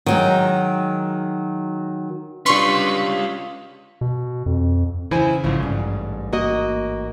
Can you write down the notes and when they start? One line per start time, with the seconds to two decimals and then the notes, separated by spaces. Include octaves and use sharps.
0.06 D#3 F#3 G#3
2.46 G3 C#4 D4 F4 B4 C6 C#6
4.01 B2
4.46 F2
5.11 C#3 E3 E4 C5 G#5
5.44 A1 G#2 C#3 F3
5.63 G2
6.33 A#3 F#4 D#5